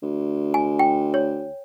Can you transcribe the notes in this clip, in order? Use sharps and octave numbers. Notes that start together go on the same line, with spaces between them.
D2
G#5
G5
C#5